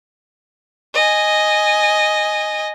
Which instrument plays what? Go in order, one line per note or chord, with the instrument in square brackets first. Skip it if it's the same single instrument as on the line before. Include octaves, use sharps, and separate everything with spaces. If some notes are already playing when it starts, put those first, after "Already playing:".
[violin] D#5 G#5